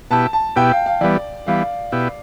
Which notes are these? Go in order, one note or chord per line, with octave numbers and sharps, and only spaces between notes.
B2 B3 E4 G4 A5
A5
B2 B3 E4 G4 G5
F5
F5
E3 G3 B3 D5
E3 G3 B3 F5
B2 B3 E4 G4